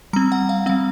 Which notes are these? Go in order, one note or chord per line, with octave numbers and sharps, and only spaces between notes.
G3 C4 A#5
F#5
F5
G3 C4 F5